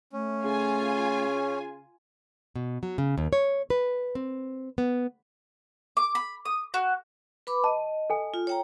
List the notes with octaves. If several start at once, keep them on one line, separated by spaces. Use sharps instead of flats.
A3 C#4
C#3 F4 G#5
B2
F#3
C#3
D#2
C#5
B4
C4
B3
D6
B5
D#6
F#4
B4 B5 D6
D#5 A5
A4 G#5
F4
C#5 G5 A#5